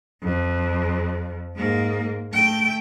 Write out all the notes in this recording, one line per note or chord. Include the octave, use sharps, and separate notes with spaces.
F2
G#2 A#3
A3 G5